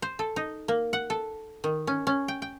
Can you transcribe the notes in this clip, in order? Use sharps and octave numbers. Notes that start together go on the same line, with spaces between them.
C5
A4
D#4
A#3
F#5
A4
D#3
C#4
C#4
G5
G5